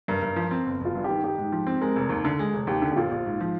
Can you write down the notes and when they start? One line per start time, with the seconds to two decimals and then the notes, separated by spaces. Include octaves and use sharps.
0.08 G2 A#4
0.22 G2
0.36 F3
0.51 C4
0.66 G1
0.81 G1 F4
0.95 G2
1.04 G4
1.10 D#3
1.24 D#4 G4
1.38 G#2
1.52 F3
1.67 C4
1.81 G#3 A#4
1.96 F1
2.09 D#2
2.25 D3
2.39 G#3
2.53 F1
2.67 D#2 G4
2.82 D3
2.92 G4
2.96 A#1 F4
3.11 A#1
3.26 G#2
3.40 F3